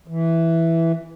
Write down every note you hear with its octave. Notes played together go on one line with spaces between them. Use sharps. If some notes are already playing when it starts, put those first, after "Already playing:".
E3